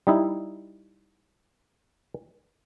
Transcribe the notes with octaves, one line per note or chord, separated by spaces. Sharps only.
G3 D#4 E4